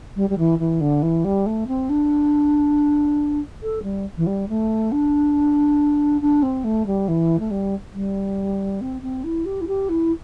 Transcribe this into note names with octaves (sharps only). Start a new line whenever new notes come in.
G3
G3
E3
E3
D3
E3
G3
A3
C4
D4
A4
G3
E3
G3
A3
D4
D4
C4
A3
G3
E3
A3
G3
G3
C4
C4
E4
G4
E4
G4
E4